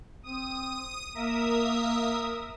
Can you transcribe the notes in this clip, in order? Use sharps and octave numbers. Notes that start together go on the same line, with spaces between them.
C4 D#6 D#7
A#3 A#4 E5 D#6